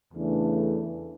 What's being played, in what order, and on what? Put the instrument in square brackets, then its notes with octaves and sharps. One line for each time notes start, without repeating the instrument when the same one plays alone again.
[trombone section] E2 C#3 E3 A3 D4